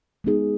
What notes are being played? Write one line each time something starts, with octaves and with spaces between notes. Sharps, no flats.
G#3 B3 D#4 G#4